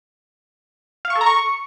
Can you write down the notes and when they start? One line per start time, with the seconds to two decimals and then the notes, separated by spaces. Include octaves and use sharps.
1.05 F5
1.10 C#6
1.16 A4
1.21 A#5
1.26 C#6